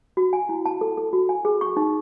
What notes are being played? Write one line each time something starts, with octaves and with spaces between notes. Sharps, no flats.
F#4
G#5
E4
A5
A4
A4
F#4
G#5
G#4
C#6
D#4